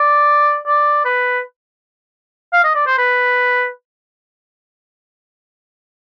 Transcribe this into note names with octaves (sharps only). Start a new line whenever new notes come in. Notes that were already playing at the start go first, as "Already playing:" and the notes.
Already playing: D5
D5
B4
F5
D#5
D5
C5
B4